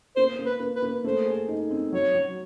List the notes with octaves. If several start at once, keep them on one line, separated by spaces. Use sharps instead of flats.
A#3 C5
A#3
B4
A#3
B4
A#3
A3 C5
G#4
D#4
C4
F#3 C#5
F#3